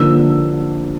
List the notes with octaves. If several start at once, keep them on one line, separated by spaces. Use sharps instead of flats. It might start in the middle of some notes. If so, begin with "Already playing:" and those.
Already playing: D3 F3 A#3 D4 E6